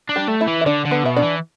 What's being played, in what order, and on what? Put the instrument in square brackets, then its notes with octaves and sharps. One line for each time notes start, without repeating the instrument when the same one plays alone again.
[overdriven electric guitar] D4
[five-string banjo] G3 G4
[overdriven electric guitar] A3
[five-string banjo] E4 E5
[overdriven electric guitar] E3
[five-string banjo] E5
[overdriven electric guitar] D3 [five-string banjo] D4 D5
[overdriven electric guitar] D3
[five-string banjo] B3 B4
[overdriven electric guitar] B2 [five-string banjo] E5
[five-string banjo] D4 D5
[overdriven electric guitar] E3